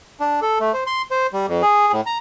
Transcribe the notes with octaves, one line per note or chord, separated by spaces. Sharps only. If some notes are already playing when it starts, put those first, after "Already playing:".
D4
A4
A3
C5
C6
C5
G3
F2
G#4
A2
A#5